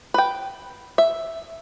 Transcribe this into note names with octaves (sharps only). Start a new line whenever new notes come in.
B4 G5
E5